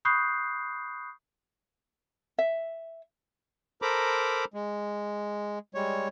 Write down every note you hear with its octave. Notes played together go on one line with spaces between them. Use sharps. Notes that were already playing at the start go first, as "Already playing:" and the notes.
B5 C#6 D#6 F#6 G6 C7
E5
A4 A#4 C5 A#5 B5 D6
G#3
G3 G#3 C#5